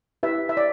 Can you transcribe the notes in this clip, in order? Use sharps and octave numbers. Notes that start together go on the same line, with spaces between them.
E4 G4 B4 E5
E5
D5